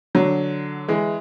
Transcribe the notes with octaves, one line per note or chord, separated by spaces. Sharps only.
D3 F#3
E3 G#3